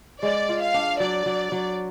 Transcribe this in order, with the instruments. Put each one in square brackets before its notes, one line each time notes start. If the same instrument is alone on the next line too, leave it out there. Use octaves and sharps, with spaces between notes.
[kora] G#3 [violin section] D5
[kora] F4
[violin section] F5
[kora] D4
[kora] F#3 [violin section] D5
[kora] F#3
F#3